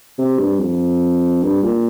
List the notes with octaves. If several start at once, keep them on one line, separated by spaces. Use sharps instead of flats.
C3
G2
F2
G2
A#2